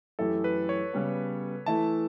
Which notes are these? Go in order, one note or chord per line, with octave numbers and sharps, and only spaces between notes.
F#2 E3 A3 E4 G4 A4
B4
C#5
C#3 G3 B3
E3 A3 E4 A5